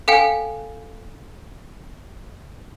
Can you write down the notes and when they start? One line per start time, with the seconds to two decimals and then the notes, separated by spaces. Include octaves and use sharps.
0.08 A4 F5 G5 G#5